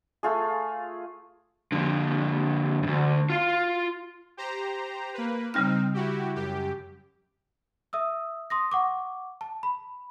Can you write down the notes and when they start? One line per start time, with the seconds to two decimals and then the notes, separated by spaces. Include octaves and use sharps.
0.23 A3 F4 G#4
1.72 F2 D3
2.83 D2 G2
3.30 F4 F5
4.37 G4 C5 A#5
5.14 A#3 B4
5.54 C#3 G3 C4 D#4 F6
5.94 E4 F#4 G4
6.36 F#2 G4
7.93 E5 D#6 E6
8.50 C6 D#6 A#6
8.72 F#5 C#6 D6
9.41 A5
9.63 B5